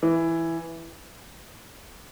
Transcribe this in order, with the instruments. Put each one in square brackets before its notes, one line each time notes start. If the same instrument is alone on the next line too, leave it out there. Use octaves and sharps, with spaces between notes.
[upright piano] E3